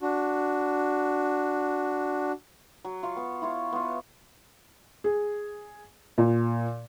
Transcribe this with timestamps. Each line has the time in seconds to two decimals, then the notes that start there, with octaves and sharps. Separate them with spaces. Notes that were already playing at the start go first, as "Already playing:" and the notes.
0.01 D4 F#4
2.85 F#3
3.03 F4 F5 C#6
3.17 B3
3.42 E4 F4 C#5
3.73 B3 F4
5.04 G#4
6.18 A#2